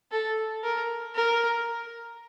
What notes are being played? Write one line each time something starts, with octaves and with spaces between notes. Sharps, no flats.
A4
A#4
A#4